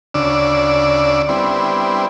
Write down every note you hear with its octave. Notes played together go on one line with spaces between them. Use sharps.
D2 C#3 D4 D5 E6
G3 B3 C4 D4 E4